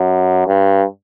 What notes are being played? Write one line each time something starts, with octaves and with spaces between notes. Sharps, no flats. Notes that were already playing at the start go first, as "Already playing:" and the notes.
Already playing: F#2
G2